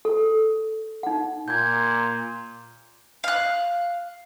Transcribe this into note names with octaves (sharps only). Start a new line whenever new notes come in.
A4
D#4 F#5
A#2 G6 G#6
F5 F#6